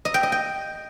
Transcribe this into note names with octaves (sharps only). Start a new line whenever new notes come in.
D#5
G5
D#5
G5